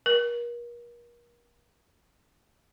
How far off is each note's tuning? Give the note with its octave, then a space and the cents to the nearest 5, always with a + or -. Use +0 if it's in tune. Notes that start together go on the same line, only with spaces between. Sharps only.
A#4 +40